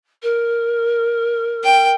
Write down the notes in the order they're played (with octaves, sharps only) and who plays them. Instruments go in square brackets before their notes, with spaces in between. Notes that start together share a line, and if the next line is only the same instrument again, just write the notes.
[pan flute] A#4
[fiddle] G5